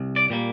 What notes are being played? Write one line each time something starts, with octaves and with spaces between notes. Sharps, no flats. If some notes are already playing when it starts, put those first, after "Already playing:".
Already playing: C2
D5
A#2 G3 A#3